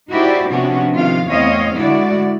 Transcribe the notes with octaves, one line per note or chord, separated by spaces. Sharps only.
D#4 E4 F#4 G4 C5 D5
C3 F3 B3 C#4 D4 F#4
C3 D#3 F3 F4 F5
E2 A3 C4 C#5 D#5 F5
D3 G#3 E4 F#4 D5